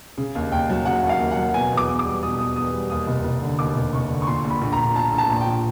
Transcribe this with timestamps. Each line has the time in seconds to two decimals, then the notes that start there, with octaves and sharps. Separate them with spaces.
0.17 C#3
0.35 D#2
0.52 D#2 G5
0.70 F#3
0.86 C#3 F#5
1.03 D#2
1.09 F5
1.19 D#2
1.31 F#5
1.37 F#3
1.54 B2 G#5
1.72 E2
1.77 D6
1.89 E2
1.99 D6
2.06 G3
2.23 B2 D#6
2.38 E2 D#6
2.56 E2 D#6
2.73 G3
2.90 D#2 D#6
3.07 F1
3.24 F1
3.42 D3
3.59 D#2 D6
3.75 F1
3.93 F1 C#6
4.10 D3
4.22 C#6
4.27 A#2 C6
4.44 A#1
4.50 B5
4.61 A#1
4.73 A#5
4.79 F3
4.95 A#2 A5
5.12 A#1
5.18 A5
5.30 A#1
5.40 G5
5.46 F3